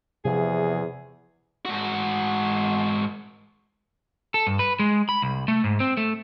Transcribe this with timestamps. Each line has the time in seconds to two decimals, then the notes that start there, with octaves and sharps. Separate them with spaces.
0.25 E2 C3 F3 G#4
1.65 G#2 F#4
4.34 A4
4.47 G2
4.59 B4
4.79 G#3
5.09 B5
5.22 C2
5.48 A3
5.64 G#2
5.80 C4
5.97 A3